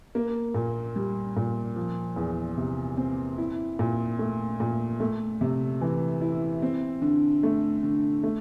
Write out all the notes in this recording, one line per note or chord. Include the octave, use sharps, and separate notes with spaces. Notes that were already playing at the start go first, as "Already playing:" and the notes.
A#3
A#2
G3
A#2
F3
E2
C3
C4
E4
A#2
A3
A#2
A3
C3
E3
E4
C4
D3
A3
D3
A3